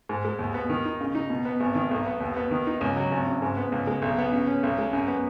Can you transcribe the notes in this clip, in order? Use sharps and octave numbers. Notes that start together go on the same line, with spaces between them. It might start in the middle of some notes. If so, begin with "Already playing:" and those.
G#2
G#3
D#2
B3
D#3
D#4
C#3
D#4
B2
B3
G#1
D#3
B1
B3
D#2
B3
D#3
D#4
C#2
F#3
G#1
C#3
G#2
B3
C#2
G#3
B1
B3
C#3
C#4
B1
G#3
F#2
B3